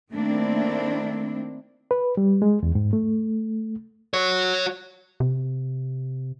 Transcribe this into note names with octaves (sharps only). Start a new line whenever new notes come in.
D#3 A3 A#3 C4 D4 E4
B4
G3
G#3
E2
G#2
A3
F#4 C#5
C3